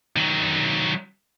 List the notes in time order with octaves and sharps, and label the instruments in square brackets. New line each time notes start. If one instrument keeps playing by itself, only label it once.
[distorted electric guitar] D#3 F#3